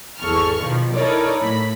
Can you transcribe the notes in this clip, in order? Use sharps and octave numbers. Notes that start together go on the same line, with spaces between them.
G#1 E2 A4 C#6 F6
B2 D#3 F3
D#4 E4 A4 A#4 C#5 D5
A2 B5